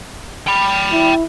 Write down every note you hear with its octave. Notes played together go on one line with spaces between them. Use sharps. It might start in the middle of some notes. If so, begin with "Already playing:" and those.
G5 B5
E4